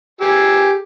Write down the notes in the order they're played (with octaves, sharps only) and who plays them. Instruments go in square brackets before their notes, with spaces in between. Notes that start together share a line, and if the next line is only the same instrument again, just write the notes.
[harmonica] G4 G#4 E6